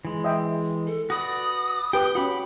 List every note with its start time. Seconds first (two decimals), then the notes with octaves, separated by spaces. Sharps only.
0.05 E3 G#3
0.24 D#5 E5 G5
0.87 A4
1.10 F#4 B4 D5 D#6
1.93 G4 B4 G5
2.15 C#4 F#4 F#5 B5 D6